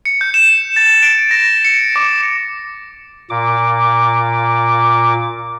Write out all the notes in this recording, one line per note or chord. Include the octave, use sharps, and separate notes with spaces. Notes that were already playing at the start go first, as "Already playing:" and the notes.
C#7
G6
E7
A6
D7
A#6
C#7
D6
A#2 D6